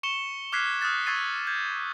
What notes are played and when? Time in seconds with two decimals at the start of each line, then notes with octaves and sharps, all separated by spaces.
0.03 C#6 C#7 E7 G7
0.52 D6 F6 F#6 G#6 B6 C7
0.81 D#6 F6 F#6 A6
1.06 C#6 E6 G#6 A6 C7 D#7
1.47 G6 G#6